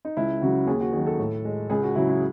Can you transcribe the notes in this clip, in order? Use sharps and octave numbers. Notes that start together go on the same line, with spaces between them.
D#4
C#2 E4
C#3 F#3 F#4
D#2 G#4
F#4
D#3 F#3 G#4
A4
A2
G#3
C#2 G#4
F#4
C#3 F#3 E4
E4